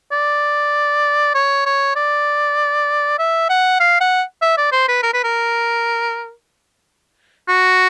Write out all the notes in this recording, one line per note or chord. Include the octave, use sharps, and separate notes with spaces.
D5
C#5
C#5
D5
E5
F#5
F5
F#5
E5
D5
C5
B4
A#4
B4
A#4
F#4